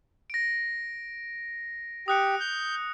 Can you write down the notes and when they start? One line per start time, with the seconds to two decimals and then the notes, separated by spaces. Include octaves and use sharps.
0.30 A#6 D7
2.08 G4 D#6 F#6 C#7
2.40 G6